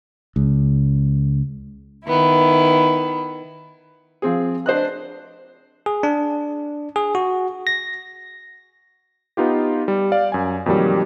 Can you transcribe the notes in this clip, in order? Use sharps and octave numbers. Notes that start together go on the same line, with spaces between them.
C#2
D#3 B3 E4
F3 C4 G#4
D4 C5 D#5 F#6
G#4
D4
G#4
F#4
A#6
B3 D#4 F4 G4
G3
D5 F5
F#2 G#5
F2 A#2 D#3 F#3 G3